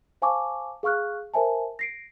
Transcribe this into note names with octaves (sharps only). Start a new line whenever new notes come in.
C5 F5 G#5 A5 C#6 D6
G#4 F5 C#6 F6 F#6
A#4 C5 E5 G#5 A5
A#6 C7 D7